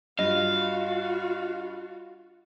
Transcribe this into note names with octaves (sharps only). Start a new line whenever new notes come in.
G2 F4 F#4 D#5 F5